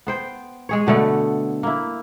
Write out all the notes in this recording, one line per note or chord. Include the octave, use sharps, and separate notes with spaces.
B3 C5 G5
G#3 G#4 C#5
B2 D3 A3 B3
A#3 E4